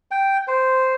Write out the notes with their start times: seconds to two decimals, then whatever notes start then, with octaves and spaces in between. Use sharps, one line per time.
0.11 G5
0.48 C5